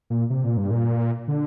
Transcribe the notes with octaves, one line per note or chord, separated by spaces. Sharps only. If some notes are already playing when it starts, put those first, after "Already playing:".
A#2
C3
A#2
G2
A#2
D3